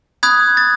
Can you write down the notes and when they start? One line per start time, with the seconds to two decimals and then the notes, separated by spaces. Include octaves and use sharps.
0.23 B5 D#6 F#6 G#6
0.57 A6